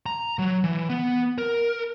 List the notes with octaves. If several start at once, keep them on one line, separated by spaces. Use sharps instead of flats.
A#5
F#3
E3
B3
A#4